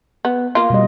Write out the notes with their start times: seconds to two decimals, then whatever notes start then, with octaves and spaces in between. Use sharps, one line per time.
0.25 B3
0.55 A#3 F4
0.70 B2 G3 D#5